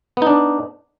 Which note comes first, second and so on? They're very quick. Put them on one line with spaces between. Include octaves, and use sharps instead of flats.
B3 D#4 D4